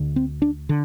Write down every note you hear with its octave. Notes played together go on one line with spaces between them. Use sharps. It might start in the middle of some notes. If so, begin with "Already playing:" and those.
Already playing: D2 D3
C4
D4
D3